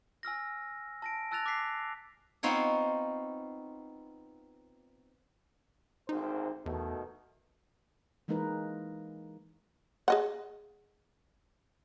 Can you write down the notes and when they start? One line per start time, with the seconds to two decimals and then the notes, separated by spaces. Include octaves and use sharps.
0.23 G#5 E6 F6 A#6
1.02 A5 A#6 D7
1.31 A5 E6 F#6 A6 A#6 F7
1.46 D6 F#6 A6 B6 C7
2.43 B3 C4 D#4 F4 C#5
6.09 G#1 D2 D#4 C5
6.66 E2 B2 D#3 A3
8.28 E3 G#3 A#3 D#4 A#4 B4
10.08 G#4 D#5 F#5